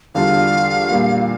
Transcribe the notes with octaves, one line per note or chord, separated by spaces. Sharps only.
E2 D3 G3 D4 F4 F5
A#2 G3 A#3